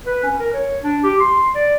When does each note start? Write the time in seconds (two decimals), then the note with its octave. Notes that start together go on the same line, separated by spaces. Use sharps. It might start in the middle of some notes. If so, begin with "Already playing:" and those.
0.06 B4
0.23 C#4
0.39 A#4
0.53 C#5
0.83 D4
1.03 G4
1.20 C6
1.55 D5